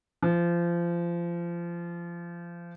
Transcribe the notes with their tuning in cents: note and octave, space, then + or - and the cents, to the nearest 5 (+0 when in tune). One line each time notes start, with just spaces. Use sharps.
F3 -25